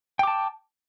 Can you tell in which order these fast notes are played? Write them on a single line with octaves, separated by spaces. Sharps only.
G5 D6 A5